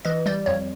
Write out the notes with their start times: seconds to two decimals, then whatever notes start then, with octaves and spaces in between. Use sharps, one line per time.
0.05 E3 D#5
0.26 G3 D5
0.46 F2 C#5